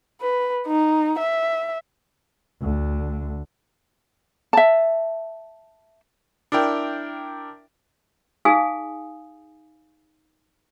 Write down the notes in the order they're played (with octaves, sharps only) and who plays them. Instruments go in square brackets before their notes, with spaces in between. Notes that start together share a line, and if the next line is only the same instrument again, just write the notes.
[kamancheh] B4
D#4
E5
[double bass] D2 D3
[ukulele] E5 A5
[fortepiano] D4 E4 A#4 G5
[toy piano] D#4 G#4 F5 G#5 D#6